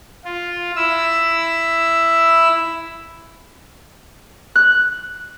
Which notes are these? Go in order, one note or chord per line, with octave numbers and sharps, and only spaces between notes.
F4
E4 E6
F#6